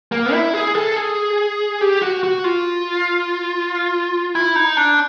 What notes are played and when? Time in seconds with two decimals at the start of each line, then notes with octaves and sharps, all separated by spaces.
0.12 A#3
0.33 E4
0.54 G#4
0.75 A4
0.96 G#4
1.81 G4
2.02 F#4
2.23 F#4
2.44 F4
4.35 E4
4.56 D#4
4.77 D4